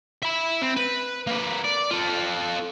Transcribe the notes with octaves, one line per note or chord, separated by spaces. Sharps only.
E5 B5
C4
B4
A#3 B4
D5
F4 A4